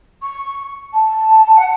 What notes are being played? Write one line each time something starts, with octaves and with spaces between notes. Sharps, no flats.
C#6
A5
F#5